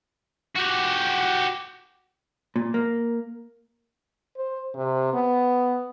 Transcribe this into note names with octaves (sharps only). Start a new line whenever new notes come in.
F#4 G4
A#2
A#3
C5
C3
B3